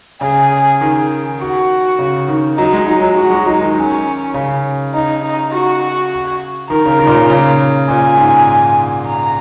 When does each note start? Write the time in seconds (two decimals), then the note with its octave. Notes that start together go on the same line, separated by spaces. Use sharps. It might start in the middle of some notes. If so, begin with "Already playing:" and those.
0.21 C#3 G#4
0.81 D#3
1.40 F#4
1.99 C#3
2.28 D#3
2.57 F#3 D#4
2.73 G#3
2.86 F#3 D#4
3.02 F#3
3.16 G#3 F#4
3.31 G#3
3.46 F#3 D#4
3.61 D#3
3.75 C#4
4.34 C#3
4.94 D#4
5.23 D#4
5.52 F#4
6.70 D#3 A#4
6.86 C#3
6.99 D#3
7.07 A#2
7.14 C#3
7.30 C#3
7.88 A#2 G#5
8.17 G#2
9.07 A#5